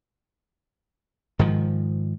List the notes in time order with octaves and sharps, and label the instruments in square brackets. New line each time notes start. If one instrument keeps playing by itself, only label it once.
[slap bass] G#2 D#3 F3